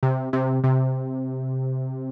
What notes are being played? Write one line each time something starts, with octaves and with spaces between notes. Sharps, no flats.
C3
C3
C3